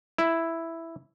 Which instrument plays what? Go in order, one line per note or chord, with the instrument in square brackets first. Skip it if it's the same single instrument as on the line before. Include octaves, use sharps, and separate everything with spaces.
[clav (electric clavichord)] E4